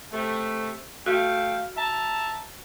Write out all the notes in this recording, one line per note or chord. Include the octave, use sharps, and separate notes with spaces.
C3 A3
A3 F#4 F5 G5
E5 A5 A#5